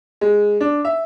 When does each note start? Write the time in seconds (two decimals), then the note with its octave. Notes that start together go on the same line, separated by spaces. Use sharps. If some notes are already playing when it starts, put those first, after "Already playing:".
0.21 G#3
0.61 D4
0.85 E5